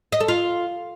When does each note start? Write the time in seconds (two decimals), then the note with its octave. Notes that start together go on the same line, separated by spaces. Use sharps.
0.12 D#5
0.20 A4
0.28 F4